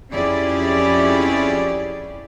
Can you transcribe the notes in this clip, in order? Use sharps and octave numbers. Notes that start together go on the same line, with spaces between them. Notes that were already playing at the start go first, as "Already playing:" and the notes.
F2 C#4 E4 G4 G#4 D5